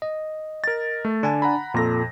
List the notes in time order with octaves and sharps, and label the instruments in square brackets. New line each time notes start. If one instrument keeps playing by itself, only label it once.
[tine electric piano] D#5
[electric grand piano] A#4 A6
A3
[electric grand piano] D3 [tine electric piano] D4 G#5 A5
[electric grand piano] F#5 A#5 B5
[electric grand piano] F2 A#6 [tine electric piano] A#2 A4